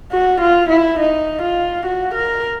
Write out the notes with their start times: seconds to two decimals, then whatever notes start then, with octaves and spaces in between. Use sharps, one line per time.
0.12 F#4
0.41 F4
0.69 E4
0.99 D#4
1.42 F4
1.86 F#4
2.14 A#4